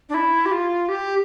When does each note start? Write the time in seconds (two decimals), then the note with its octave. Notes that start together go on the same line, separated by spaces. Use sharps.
0.09 D4
0.14 E4
0.46 G4
0.52 F4
0.89 G4